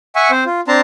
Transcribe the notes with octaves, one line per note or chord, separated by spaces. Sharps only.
E5 F#5 G#5 C#6
C4 C5
F4
C4 D4 A5 A#5 C6